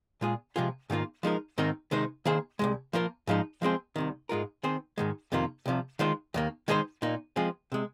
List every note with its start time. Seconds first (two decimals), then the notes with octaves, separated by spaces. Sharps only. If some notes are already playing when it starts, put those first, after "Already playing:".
0.21 A#2 G#3 F4 G#4
0.56 C3 F3 G#3 F4 G#4
0.90 G#2 D#3 A#3 F4
1.23 F3 G#3 D#4 A#4
1.58 G#2 D#3 C4 D#4 A#4
1.91 C3 D#3 G#3 D#4 C5
2.25 D#3 A#3 G#4 C5
2.59 C2 A#2 G#3
2.93 F3 A#3 F4 A#4
3.27 G#2 F3 G#3 D#4
3.62 F3 G#3 C4 G#4 C5
3.96 C2 C3 D#3
4.29 G#2 G#3 F4 A#4
4.63 D#3 C4 G#4 C5
4.98 G#2 D#3 G#3
5.32 F2 C3 D#3 A#3 F4
5.66 C2 C3 F3
5.99 D#3 G#3 F4 C5
6.34 D#2 D#3 A#3
6.68 D#3 G#3 D#4 G#4 C5
7.02 A#2 A#3 D#4
7.36 F3 G#3 C4 G#4
7.72 C3 G#3